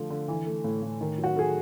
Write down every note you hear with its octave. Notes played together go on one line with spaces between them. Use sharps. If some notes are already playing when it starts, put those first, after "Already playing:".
Already playing: D3 F3 A3
D3
E3
A3
A2
A2
D#3
F#3
F#4
A3 G#4